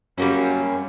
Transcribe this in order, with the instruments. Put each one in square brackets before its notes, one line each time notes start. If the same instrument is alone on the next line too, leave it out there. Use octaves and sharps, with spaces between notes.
[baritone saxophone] F#2 [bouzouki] G3 A#3 C#4